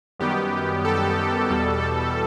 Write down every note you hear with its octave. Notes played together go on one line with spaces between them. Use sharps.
F#2 D#3 G3 B3 G4
A4
E2 B2 G3